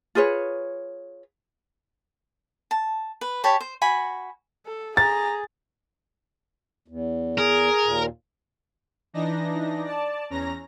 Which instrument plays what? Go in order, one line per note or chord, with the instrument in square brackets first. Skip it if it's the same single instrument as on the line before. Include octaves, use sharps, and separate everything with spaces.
[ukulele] F4 G#4 B4 C#5
[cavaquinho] A5
B4
G4 C#5 A5 B5
C5
F#4 G#5 B5
[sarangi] A4
[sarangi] G#4 [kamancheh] A#5 [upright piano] A6
[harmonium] E2
[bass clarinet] G#4 [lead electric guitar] A#4
[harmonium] D#2 A#2
[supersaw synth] E3 D4 D#4 A#6
D5 A5
E2 C#4 A#5 A#6